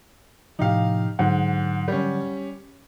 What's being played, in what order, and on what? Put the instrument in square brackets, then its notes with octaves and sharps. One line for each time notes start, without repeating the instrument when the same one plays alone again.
[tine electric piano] A2 C3 F3 [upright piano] D#4 G4 F5
[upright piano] G#2 [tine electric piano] D3 F#3 F#5
[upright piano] G3 C#4